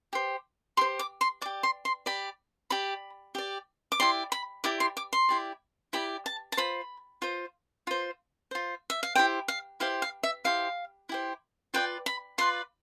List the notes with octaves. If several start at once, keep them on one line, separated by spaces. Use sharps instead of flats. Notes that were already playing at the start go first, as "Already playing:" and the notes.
G4 C5
G4 C5 C6
D6
C6
G4 D5 D6
C6
C6
G4 D5 B5
G4 D5 B5
G4 D5
D6
E4 G4 D5 C6
B5
E4 G4 D5 D6
C6
D6
C6
E4 G4 D5
E4 G4 D5 B5
A5
A5
F4 C5 B5
F4 C5
F4 C5
F4 C5
E5
F5
E4 G4 C5 G5
F5
E4 G4 C5 F5
F5
E5
E4 G4 C5 F5
E4 G4 C5
F4 B4 D5 G5
B5
F4 B4 D5 C6